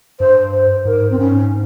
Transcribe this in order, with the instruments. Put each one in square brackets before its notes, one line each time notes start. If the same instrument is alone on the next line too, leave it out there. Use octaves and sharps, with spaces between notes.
[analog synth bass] G2 [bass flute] C5
[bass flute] C5
[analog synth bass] G#2 [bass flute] A#4
[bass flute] C4
[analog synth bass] G#2 [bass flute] C#4